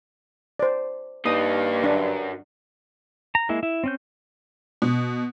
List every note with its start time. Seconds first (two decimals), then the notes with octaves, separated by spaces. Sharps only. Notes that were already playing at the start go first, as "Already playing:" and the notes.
0.59 C5 D5
1.26 G2 A#3 D#4 D#6
1.84 F#2 D4
3.35 A#5
3.49 G#3 A#3 E4
3.63 E4
3.84 C4 C#4 G6
4.82 B2